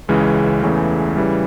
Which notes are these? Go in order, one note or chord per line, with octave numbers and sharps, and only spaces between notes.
C#2 C#3 E3 G#3 C#4
E2 C#3 E3 A3
C#3 E3 G3